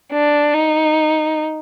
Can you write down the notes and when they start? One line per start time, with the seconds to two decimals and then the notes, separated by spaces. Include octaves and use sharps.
0.12 D4
0.54 D#4